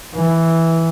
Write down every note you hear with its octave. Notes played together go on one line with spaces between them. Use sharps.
E3